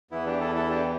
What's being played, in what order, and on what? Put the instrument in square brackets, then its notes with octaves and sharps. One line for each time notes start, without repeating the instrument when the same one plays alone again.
[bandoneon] E2 E3 B3 E4
D4 G4
E4 A4
E4 A4
D4 G4